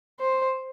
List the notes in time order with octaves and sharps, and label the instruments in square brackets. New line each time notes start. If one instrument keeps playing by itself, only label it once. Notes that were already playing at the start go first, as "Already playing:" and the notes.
[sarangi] C5